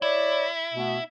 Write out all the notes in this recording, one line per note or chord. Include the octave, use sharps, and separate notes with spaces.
E4 C#5 D5
B2 A3 B3